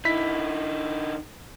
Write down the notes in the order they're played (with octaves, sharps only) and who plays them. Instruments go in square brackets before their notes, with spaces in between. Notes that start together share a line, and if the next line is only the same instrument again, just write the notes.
[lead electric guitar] D3 D#4 [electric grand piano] E4 B6